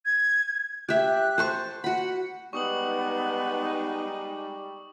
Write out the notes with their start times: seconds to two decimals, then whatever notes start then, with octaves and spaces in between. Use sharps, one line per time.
0.06 G#6
0.89 G4 E5 F#6
1.38 C5 A5 C#6
1.84 F#4 F#5 B5
2.53 G3 G#3 B3 D#4 C#6 D#6 F#7